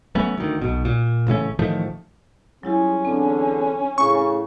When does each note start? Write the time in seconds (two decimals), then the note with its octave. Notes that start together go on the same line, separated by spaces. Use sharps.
0.15 F#3 A3 B3 C#4
0.37 D2 D#3
0.62 B1 B2
0.85 A#2
1.27 A1 C#3 A3 C#4
1.59 A1 D#3 F3 A3
2.63 F#3 G3 C#4 E4 F4 G4 G#4
3.05 E2 D3 C4 D4
3.98 A2 C#3 C#6